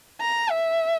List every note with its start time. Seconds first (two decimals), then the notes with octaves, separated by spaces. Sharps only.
0.21 A#5
0.51 E5